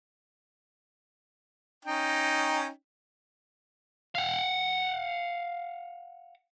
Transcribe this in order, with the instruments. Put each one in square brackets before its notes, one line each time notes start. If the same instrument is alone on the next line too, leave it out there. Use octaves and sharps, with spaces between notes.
[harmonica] C#4 D#4 G5
[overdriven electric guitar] F5 F#5